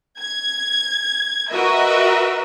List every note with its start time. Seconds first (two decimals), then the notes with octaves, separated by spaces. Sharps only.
0.20 G#6
1.52 F#4 A#4 B4 D#5 E5